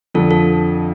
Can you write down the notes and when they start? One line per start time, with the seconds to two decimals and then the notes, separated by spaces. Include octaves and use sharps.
0.14 F2 D3 F3 A4
0.31 A4